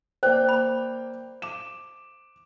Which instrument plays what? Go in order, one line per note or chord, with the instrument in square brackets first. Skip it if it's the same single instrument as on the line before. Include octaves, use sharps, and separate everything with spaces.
[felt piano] A#3 D5 G5 [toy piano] C5
[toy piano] B5
[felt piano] D6 E7